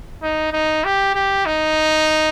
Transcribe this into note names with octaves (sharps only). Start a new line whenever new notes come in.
D#4
D#4
G4
G4
D#4